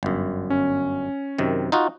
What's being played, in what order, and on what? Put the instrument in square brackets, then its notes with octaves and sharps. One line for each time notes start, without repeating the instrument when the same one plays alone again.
[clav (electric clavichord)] G1 F#2
[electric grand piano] C#4
[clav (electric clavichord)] F#2 C3 D#3
D#4 F4 F#4